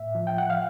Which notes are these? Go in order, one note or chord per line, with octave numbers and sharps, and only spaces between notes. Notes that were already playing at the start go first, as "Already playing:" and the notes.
Already playing: A2 E5
F3
G5
F#5
F5